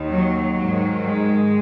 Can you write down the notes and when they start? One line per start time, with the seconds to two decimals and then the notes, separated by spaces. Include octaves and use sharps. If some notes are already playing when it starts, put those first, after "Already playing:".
Already playing: D#2 D#3
0.13 F#3
0.58 G#2 D#3
1.03 G#3